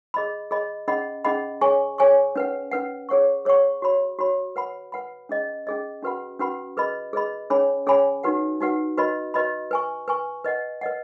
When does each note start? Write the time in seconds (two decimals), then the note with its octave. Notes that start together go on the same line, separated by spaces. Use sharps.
0.14 G#4 D#5 B5
0.51 G#4 D#5 B5
0.88 C#4 G#4 D#5 F#5 B5
1.24 C#4 G#4 D#5 F#5 B5
1.61 G#4 C#5 G#5 C#6
1.98 G#4 C#5 G#5 C#6
2.36 C#4 B4 F#5
2.72 C#4 B4 F#5
3.09 G#4 C#5 F#5 C#6
3.45 G#4 C#5 F#5 C#6
3.82 F#4 C#5 B5
4.19 F#4 C#5 B5
4.56 B4 F#5 B5
4.92 B4 F#5 B5
5.29 C#4 G#4 D#5
5.67 C#4 G#4 D#5
6.02 C#4 F#4 B4 F#5 B5
6.39 C#4 F#4 B4 F#5 B5
6.77 G#4 B4 D#5 B5
7.13 G#4 B4 D#5 B5
7.50 C#4 G#4 C#5 G#5 B5
7.87 C#4 G#4 C#5 G#5 B5
8.23 D#4 F#4 B4 F#5
8.61 D#4 F#4 B4 F#5
8.98 F#4 B4 D#5 B5
9.34 F#4 B4 D#5 B5
9.71 B4 G#5 C#6
10.08 B4 G#5 C#6
10.45 B4 D#5 F#5
10.81 B4 D#5 F#5